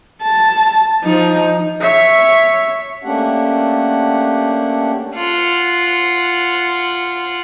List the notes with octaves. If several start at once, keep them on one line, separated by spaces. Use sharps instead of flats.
A5
F3 D#4
C#5 E5
A3 A#3 C#4 D4 G4 F#5
F4 F#5